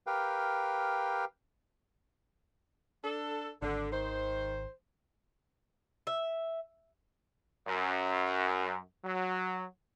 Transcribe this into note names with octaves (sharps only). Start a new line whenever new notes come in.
G4 A#4 B4 F5 G5
D4 A4
G#1 D3
D#3 C5
E5
F#2
F#3